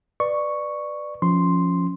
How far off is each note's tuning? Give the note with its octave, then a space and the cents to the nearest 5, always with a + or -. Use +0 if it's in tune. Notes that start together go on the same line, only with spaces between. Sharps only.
B4 +0 D5 +15 C#6 +0
F3 +0 C#4 +0 C6 +0